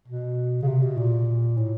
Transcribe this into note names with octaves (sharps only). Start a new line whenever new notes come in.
B2
C#3
C3
B2
A#2
A2